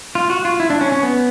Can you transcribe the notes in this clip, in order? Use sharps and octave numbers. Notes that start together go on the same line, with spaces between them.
F4
F#4
F4
E4
D4
C#4
C#4
B3